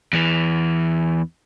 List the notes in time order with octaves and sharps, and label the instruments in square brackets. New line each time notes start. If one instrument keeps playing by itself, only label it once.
[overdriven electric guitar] E2 E3